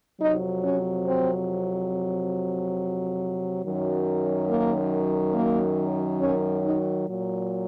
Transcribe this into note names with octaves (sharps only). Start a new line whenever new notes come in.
F2 C3 F#3 D#4
C#4
C4
F#2 D#3 F#3
A#3
A#3
C#4
D#4
A#2 F#3